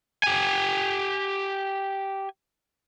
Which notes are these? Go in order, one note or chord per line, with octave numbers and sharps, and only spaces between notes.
G4 G#5